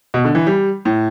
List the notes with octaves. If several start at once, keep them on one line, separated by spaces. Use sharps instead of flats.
B2
D3
E3
G3
A2